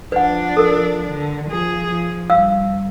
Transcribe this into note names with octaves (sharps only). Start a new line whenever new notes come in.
F3 D4 B4 F#5
A4 A#4
D3
F3 G#4
F3
G2 F5 E6